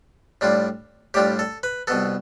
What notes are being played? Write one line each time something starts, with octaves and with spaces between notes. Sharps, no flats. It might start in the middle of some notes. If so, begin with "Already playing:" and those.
A2 G3 D4 F4
A2 G3 D4 F4 G4
A4
B4
C2 B2 B3 A4